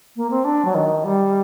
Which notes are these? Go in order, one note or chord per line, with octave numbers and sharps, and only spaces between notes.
A#3
C4
D4
F#3
D#3
G3